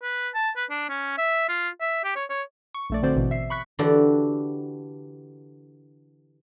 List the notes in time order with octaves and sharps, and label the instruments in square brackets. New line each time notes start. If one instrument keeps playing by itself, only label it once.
[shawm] B4
A5
B4
D4
C#4
E5
F4
E5
G4
C#5
C#5
[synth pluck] C#6
A#1 A3 D5
D3 C4 F#4 C5 D5
A1 B2 E3
E5 C7
B5 C#6 F#6 B6
[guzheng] D3 E3 F#4 G4 A4 D5